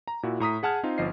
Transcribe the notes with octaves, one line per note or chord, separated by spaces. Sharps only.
A#5
A#2 E4 F#4
A2 A#5 D#6 B6
G#4 F#5 A5 F6 G#6
C4 D#4 F4 F5
G1 F3 D#5 C7